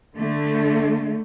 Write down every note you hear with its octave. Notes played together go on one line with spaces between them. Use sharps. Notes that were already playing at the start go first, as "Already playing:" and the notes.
D3 A3